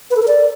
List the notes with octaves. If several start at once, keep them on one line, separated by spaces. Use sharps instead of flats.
B4
A4
A#4
D5